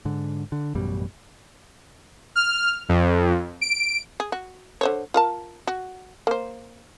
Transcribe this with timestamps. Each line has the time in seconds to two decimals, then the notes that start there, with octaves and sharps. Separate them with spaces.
0.05 G#2 D3
0.52 D3
0.75 A1 F#2 B2 G3
2.36 F6
2.89 F2
3.61 D7
4.20 G#4
4.32 F#4
4.81 D3 C5 C#5
5.14 F4 A#4 A5
5.67 F#4
6.27 A#3 C5